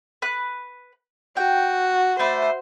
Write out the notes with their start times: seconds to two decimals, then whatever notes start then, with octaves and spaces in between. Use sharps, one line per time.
0.22 B4 F#6
1.37 F#4 G5
2.19 A3 D4 B4 C5